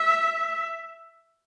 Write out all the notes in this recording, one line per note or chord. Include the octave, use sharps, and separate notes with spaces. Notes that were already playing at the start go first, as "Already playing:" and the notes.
Already playing: E5